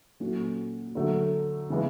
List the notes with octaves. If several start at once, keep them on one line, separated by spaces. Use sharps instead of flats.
A#2 F#3 A3 C#4 F#4
D3 F#3 A3
C#3 E3 G#3 B3